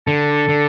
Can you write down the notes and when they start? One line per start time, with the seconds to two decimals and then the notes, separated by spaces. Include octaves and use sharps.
0.07 D3 A4
0.49 D3